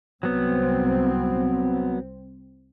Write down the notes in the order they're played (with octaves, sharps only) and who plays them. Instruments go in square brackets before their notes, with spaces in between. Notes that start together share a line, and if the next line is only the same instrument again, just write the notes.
[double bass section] C2 C4 [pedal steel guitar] F#3 B3